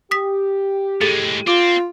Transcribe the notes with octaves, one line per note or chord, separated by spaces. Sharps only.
G4 D#6 B6
A2 G#3 G#4 A4 A6
C4 F4 D6